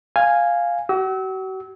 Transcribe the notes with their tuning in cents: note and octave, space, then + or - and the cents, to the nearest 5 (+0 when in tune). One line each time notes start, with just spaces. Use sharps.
F5 +0 G#5 -5
F#4 +40 E6 -30